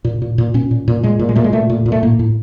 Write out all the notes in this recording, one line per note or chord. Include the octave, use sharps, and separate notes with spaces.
A#2
A#2
A#2
A#2 C#4
A#2
A#2
A#2 G#3
A#2
G#3
A#2 A3
G#3
A#2 A3
A#2
A#2
A3
A2 A#3
A2